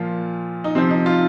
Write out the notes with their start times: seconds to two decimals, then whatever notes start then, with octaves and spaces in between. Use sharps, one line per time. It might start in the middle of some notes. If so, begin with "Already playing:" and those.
Already playing: A#2 F3 F4
0.64 D#4
0.75 C3 F3 C4
0.91 D#4
1.06 F4